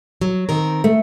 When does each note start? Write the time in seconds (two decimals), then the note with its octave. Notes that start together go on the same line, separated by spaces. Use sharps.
0.21 F#3
0.49 D#3 C4 A#4
0.84 A3